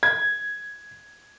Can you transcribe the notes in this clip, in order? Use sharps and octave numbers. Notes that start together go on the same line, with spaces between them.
G#6